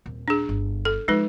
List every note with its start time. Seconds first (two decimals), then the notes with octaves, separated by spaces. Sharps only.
0.06 D#1 C4
0.28 D4 G#4
0.49 G1
0.85 A4
1.08 F3 G#3 D#4 B4